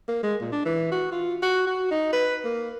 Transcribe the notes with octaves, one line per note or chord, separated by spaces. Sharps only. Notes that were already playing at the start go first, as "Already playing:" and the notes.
A#3
G#3
A#2
D4
E3
F#4
F4
F#4
F#4
D#4
B4
A#3